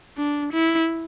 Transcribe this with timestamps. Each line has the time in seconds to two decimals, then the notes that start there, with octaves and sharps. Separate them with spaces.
0.17 D4
0.53 E4